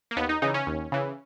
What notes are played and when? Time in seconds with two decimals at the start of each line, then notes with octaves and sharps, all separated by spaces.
0.11 A#3
0.16 D#2 B3
0.29 D#4
0.42 C#3 E3 D#4
0.54 C#4
0.67 D#2
0.92 C#3 E3